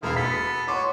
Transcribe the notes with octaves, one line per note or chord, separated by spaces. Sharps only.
E1 D#3 E4 F4
B3 A4 B6
F#4 C#5 C6 D6